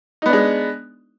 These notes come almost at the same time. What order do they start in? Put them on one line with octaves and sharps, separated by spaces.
D#4 B3 D4 G#3